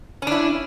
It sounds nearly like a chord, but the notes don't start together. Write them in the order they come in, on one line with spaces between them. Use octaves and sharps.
C#4 D4 E4